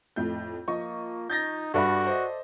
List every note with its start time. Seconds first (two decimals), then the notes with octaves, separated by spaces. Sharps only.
0.16 F2 A2 G6
0.68 F3 A#3 D#5 C#6
1.30 D#4 G6 A6 A#6
1.74 G2 F#4 A4 D5 E5 B5
2.06 C5 D#5